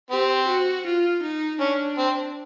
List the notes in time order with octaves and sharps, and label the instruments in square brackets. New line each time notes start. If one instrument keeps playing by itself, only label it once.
[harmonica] C4 [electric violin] G4
[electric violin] F#4
F4
D#4
[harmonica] C#4 [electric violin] D4
[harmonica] C4